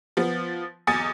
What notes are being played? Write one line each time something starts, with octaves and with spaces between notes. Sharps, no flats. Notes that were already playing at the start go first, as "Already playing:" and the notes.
F3 B3
B1 E2 G#5 D#6 A6 C#7